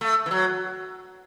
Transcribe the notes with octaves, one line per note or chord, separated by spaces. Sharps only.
A3
E3
F#3